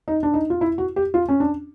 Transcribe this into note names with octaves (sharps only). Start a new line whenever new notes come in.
D#4
D4
D#4
F4
E4
F#4
G4
F4
C#4
D4